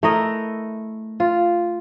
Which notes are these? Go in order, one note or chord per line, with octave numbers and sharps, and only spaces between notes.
A3 E4 A#4 D#5
F4